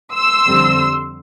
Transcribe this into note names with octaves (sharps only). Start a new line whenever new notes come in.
C6 E6
F2 D3 G3 C4